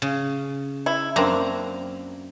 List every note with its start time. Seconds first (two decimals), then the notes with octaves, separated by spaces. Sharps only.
0.02 C#3
0.86 E4
1.16 F#2 A#3 C4 D4 A#5